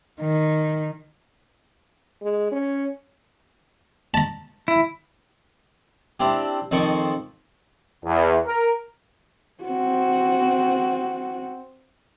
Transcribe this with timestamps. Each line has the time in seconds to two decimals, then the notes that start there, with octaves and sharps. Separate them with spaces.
0.21 D#3
2.21 G#3
2.51 C#4
4.14 A5 A#5
4.68 E4
6.20 C4 D4 E4 G4
6.71 F2 D#3 F3 C4 C#6 D6
8.04 E2
8.47 A#4
9.64 C4 F#4